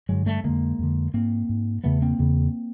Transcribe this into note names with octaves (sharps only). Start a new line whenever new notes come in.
G2 D3 F#3 G#3
G3 A3
F2 D3 G#3 A#3
F2 D3
G#2 A#3 C4
G#2
E2 C#3 A3 B3
A#3 C4
E2 C#3